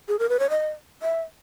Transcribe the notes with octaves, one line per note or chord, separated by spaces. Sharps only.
G#4
A#4
B4
C#5
D#5
E5